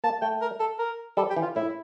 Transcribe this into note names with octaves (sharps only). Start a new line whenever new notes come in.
A#3 A5
A3 G5
A#4
A4
A#4
G3 A4
G4
E3
F4
A2 E4